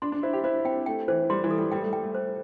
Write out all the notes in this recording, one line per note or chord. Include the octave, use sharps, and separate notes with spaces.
D4 C6
D4
E4 C5
G4
E4 C5
C4 G5
A3 G5
E3 C5
G3 C6
E3
A4
G3
G3 G5
A3
G3 G5
A3
A3 C5